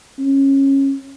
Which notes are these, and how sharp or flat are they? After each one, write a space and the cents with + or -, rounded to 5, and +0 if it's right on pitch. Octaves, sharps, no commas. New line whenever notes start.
C#4 -20